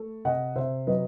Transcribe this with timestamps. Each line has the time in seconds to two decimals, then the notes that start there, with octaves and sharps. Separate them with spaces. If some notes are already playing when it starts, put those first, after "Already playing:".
Already playing: A3 A4
0.25 C3 D#5 F#5
0.56 C3 C5 E5
0.87 F#3 B4 D#5